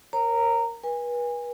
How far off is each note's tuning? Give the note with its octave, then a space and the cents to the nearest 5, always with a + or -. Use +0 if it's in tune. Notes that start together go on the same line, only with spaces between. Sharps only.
A#4 +0 C#5 -30 A#5 -15
B4 -35 G#5 -25